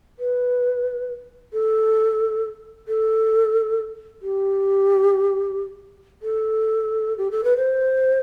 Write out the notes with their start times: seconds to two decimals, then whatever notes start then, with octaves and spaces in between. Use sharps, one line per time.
0.19 B4
1.53 A4
2.88 A4
4.22 G4
6.22 A4
7.18 G4
7.31 A4
7.44 B4
7.57 C5